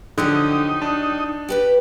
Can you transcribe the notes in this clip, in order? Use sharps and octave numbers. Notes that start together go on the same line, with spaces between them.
D3 F3 F#3 D#4 G4
D4
G4 B4 D5